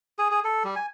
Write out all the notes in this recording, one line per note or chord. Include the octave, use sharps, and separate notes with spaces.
G#4
G#4
A4
G3
G#5